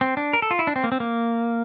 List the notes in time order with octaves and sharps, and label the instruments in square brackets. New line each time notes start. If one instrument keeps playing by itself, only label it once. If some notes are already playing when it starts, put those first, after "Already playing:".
[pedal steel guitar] C4
D4
A#4
A4
F4
E4
D4
C4
A#3
C4
A#3